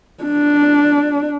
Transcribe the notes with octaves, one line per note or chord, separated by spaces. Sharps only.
D4